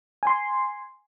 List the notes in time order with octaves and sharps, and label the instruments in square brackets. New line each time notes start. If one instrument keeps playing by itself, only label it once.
[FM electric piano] G#5 C6